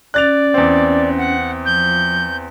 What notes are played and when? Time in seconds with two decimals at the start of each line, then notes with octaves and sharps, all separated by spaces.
0.14 C#4 D5 F#6 A6 F7
0.54 E2 C4
1.17 F#5
1.65 F3 G6